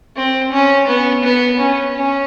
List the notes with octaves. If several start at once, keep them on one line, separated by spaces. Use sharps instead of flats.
C4
C#4
B3
B3
C#4
C#4